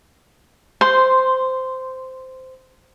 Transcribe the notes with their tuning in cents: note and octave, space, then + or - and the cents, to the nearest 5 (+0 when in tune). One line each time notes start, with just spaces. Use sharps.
C5 -10 C6 +0